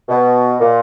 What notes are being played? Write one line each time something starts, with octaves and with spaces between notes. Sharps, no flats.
B2
A#2